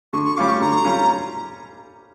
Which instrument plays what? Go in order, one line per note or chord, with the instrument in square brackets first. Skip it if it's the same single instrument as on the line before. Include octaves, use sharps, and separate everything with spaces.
[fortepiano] D3 [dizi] C#6
[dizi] C#6
[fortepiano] G3 C#4 F4 [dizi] D6
[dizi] C#6
[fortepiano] D3 [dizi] A#5
[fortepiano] G3 C#4 F4